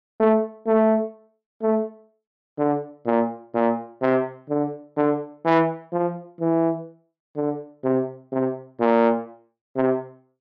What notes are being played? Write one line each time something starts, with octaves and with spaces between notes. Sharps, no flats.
A3
A3
A3
D3
A#2
A#2
C3
D3
D3
E3
F3
E3
D3
C3
C3
A#2
C3